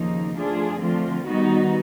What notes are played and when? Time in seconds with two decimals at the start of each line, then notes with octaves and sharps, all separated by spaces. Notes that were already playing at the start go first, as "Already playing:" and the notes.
Already playing: D#2 C#3 F3 A#3 D#4
0.35 F3 A3 D4 F4 G#4
0.82 D3 F3 A3 C4 F4
1.26 D#3 G3 B3 D#4 F#4